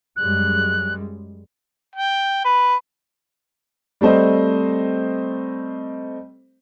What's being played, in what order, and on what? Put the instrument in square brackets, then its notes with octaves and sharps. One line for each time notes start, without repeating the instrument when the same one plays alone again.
[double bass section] F#2 G3 G#3 [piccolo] F#6
[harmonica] G5
B4
[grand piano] G3 A3 C4 C5 D#5